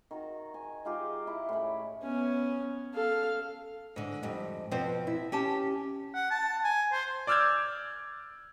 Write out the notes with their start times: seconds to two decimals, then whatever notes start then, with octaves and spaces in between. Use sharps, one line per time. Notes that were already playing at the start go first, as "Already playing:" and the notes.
0.11 D#3 F#4
0.54 G#5
0.85 G#3 D#4 F4 G4
1.27 E4
1.49 A2 C#4 B5
2.03 B3 C#4
2.94 A4 F5
3.96 G#2 D3
4.23 F2 G#2 G3
4.71 F2 B2 F3 C4 B4 C5
5.07 E4
5.32 C#4 G4 A5
6.15 F#5
6.31 A5
6.64 G#5
6.92 C5
7.27 D5 D6 E6 F6 G6 G#6